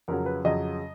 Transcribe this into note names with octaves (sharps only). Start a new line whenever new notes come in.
F2 C#3 F#3 A#4
B4
F2 C#3 F#3 D#5